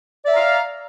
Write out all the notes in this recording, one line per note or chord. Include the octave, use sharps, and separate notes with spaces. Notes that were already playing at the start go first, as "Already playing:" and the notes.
D5 E5 F5 A#5